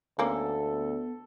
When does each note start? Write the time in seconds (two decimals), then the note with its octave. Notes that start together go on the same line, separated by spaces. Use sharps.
0.19 D2 G#3 A#3 B3 C#4 A4